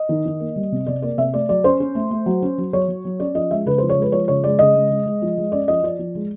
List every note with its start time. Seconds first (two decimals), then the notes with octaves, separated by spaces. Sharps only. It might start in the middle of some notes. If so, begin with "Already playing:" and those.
Already playing: D#5
0.09 D#3
0.26 D#3
0.40 A#3
0.56 G3
0.72 C3
0.86 C3 D5
1.02 A#3 D5
1.17 C3 E5
1.34 A3 D5
1.49 F#3 D5
1.64 C#4 C5
1.80 C#4
1.95 A3
2.11 A3
2.26 F#3
2.42 C#4
2.58 F#3
2.73 F#3 C#5
2.88 F#3
3.05 F#3
3.20 C#4 D5
3.35 F3 D#5
3.51 G#3 E5
3.66 C#3 B4
3.78 F3 C5
3.90 C#5
3.97 G#3 B4
4.12 F3 C#5
4.28 C#3 C#5
4.44 G#3 D5
4.59 C#3 D#5
4.75 G#3
4.90 G#3
5.06 G#3
5.22 F3
5.37 G#3
5.52 C#4 D5
5.68 F3 D#5
5.83 F3 D5
5.99 F3
6.15 G#3